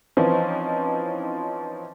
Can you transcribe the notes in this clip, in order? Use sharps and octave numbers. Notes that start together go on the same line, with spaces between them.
E3 F3 C4 C#4 D#4